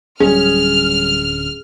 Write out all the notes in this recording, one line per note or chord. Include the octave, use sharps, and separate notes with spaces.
D1 F#3 G3 C#4 G#4 F6